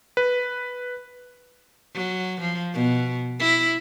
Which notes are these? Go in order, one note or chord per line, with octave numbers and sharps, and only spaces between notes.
B4
F#3
F3
B2
E4